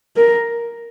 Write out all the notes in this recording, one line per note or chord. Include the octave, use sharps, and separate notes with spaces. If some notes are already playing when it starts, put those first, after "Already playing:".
A#4